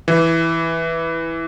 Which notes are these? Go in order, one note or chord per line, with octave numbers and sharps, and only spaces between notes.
E3